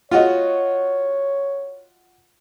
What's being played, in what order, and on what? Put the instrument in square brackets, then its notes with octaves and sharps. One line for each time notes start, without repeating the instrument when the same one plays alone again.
[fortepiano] F4 F#4 D#5 [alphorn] C#5